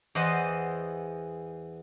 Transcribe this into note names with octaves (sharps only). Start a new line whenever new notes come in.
E2 E3 C5 D#5 F#5 C6